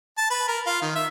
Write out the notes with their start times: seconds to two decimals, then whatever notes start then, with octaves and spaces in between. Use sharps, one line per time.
0.18 A5
0.31 B4
0.48 A#4
0.67 F4
0.82 D#3
0.96 E5